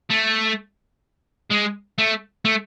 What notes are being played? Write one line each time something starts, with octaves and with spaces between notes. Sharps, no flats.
A3
G#3
A3
A3